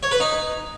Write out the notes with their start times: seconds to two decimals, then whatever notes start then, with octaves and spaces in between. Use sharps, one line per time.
0.03 C#5
0.11 B4
0.20 D#4